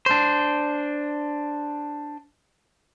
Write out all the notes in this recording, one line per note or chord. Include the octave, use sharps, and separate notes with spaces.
D4 C5